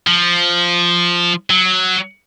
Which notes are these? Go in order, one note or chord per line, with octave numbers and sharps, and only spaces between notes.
F3
F#3